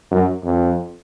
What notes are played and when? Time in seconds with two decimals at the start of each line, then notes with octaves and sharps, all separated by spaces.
0.11 F#2
0.44 F2